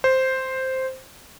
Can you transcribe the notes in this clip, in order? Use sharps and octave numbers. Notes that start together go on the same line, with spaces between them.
C5